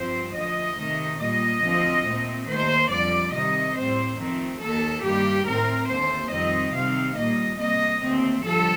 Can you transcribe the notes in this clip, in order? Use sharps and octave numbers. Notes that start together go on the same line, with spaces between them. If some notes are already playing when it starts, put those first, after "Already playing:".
Already playing: G2 F3 C4 C5
D2 D3 F3 D#5
C3 D#3 A3
A#2 G3 A#3 D#5
D2 D3 F3 C4
A#2 A3 C4
D#2 D#3 A3 C5
F2 D3 G3 D5
C3 D#3 G3 D#5
A2 G3 C4 C5
F2 D#3 A3 C4
D#2 D#3 A#3 A4
G2 D#3 G3 A#3 G4
A2 A3 C4 A#4
D#2 D3 A3 C5
F2 D#3 G3 C4 D#5
C3 D#3 G3 C4 F5
A#2 G3 A#3 D#5
C3 G3 A#3 D#5
D#2 D3 A3 C4
G2 D3 F3 A4